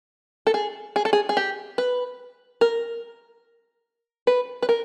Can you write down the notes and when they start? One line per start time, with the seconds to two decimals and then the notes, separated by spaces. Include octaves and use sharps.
0.47 A4
0.54 G#4
0.96 G#4
1.05 A4
1.13 G#4
1.29 G#4
1.37 G4
1.78 B4
2.61 A#4
4.27 B4
4.62 B4
4.69 A#4